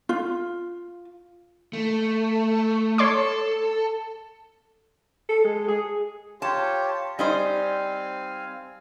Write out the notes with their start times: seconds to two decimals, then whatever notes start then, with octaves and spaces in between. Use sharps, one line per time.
0.09 F4
1.73 A3
2.98 A4 C#5 C6 D6
5.29 A4
5.45 G#3
5.68 G#4
6.42 F4 G4 C#5 A5
7.19 G3 C4 D#4 C5 F5 G#5